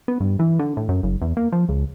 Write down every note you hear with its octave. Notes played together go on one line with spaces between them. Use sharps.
B3
G2
E3
D3
A2
F#2
F#1
E2
A#3
F3
C#2